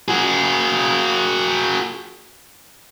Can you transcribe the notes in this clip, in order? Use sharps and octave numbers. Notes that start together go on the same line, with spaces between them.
F#4 G#4